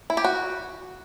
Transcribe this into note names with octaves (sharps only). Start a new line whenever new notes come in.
E4
G4
F#4